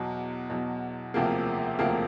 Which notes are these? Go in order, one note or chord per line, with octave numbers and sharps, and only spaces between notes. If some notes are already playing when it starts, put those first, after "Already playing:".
Already playing: E2 B2 F#3
E2 B2 F#3
E1 D2 C3 F3 A#3
E1 D2 C3 F3 A#3